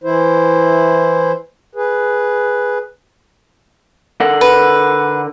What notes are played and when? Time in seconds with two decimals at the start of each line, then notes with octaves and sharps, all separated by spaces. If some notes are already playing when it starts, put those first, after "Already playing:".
0.04 E3 E4 C5
1.75 G#4 B4
4.20 D3 A#4 F#5
4.41 B4